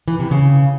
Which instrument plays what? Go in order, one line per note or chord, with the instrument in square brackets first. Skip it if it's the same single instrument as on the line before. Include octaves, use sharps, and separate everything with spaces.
[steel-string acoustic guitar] E3
C3
C#3